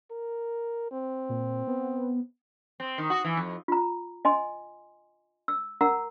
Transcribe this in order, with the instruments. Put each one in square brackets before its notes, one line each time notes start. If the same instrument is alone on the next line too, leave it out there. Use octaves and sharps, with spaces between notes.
[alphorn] A#4
C4
[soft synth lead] A#2
B3
[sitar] C4
D#3
F#4
E3
F2
[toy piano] F4 A#5
D#5 G#5 C6
E6
A#4 F#5 A#5 E6